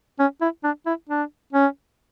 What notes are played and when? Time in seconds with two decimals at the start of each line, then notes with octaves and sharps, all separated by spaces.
0.20 C#4
0.42 E4
0.64 D4
0.86 E4
1.10 D4
1.53 C#4